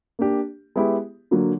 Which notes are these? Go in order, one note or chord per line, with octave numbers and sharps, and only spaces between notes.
A#3 D4 G4
G#3 B3 E4 G4
D3 F#3 A#3